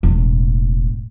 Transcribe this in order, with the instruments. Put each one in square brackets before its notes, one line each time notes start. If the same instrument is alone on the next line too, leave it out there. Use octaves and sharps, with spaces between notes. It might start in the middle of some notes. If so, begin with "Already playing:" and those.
[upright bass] E1 A2